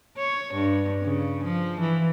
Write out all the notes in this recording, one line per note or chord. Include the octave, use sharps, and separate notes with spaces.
C#5
G2
C#3
F3
E3